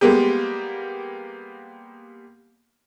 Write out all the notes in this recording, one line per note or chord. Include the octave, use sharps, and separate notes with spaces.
G3 G#3 A#3 B3 G4